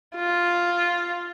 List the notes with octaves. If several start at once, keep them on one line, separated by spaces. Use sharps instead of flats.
F4